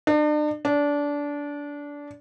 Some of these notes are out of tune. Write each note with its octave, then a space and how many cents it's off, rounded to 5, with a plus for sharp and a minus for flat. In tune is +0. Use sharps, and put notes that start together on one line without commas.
D4 +40
D4 -20